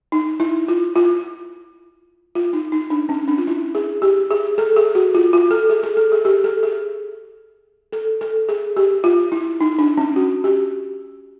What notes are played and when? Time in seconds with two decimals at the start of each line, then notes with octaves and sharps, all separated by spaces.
0.12 D#4
0.40 E4
0.68 F4
0.95 F4
2.35 F4
2.53 D#4
2.72 D#4
2.90 D4
3.09 C#4
3.28 D4
3.38 F4
3.47 E4
3.75 G#4
4.02 G4
4.31 G#4
4.58 A4
4.76 G#4
4.95 F#4
5.15 F4
5.33 F4
5.51 A4
5.70 G#4
5.83 A4
5.97 A4
6.12 G#4
6.25 G4
6.44 A4
6.63 G#4
7.93 A4
8.21 A4
8.49 G#4
8.77 G4
9.04 F4
9.32 E4
9.61 D#4
9.79 D4
9.97 C#4
10.16 F#4
10.44 G4